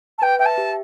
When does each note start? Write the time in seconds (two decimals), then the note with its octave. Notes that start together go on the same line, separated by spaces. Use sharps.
0.18 A5
0.22 B4 G5
0.39 E5 G5
0.45 A5
0.58 G4